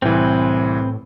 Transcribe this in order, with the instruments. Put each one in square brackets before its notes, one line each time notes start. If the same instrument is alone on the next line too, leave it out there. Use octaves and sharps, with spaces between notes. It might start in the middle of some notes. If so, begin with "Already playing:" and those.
[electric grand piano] C2 E3 [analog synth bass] A2 [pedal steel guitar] C4 B4